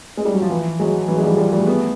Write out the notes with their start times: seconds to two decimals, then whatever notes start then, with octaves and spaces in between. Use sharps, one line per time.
0.17 G#3
0.25 G3
0.34 F#3
0.42 F3
0.50 E3
0.79 F#3 G#3
1.08 E3 F#3
1.17 G#3
1.23 F3 G3
1.37 F3 G3
1.53 G3 A3
1.67 A3 B3